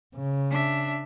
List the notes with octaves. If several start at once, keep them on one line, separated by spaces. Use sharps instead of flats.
C#3
D4 E5